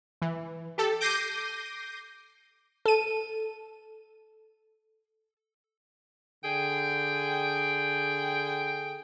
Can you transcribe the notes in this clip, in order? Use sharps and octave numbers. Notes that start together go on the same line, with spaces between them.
E3
G4 A4
D6 G6 A#6 C7 D#7
A4 D#7
D3 G#4 G5